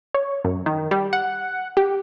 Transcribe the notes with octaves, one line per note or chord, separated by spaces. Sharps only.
C#5
F#2
D#3
G3
F#5
G4